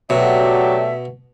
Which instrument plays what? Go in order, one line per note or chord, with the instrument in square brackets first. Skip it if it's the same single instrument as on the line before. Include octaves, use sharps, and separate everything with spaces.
[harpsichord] B2 [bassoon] F#3 [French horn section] A3 G4 D5 [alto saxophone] E5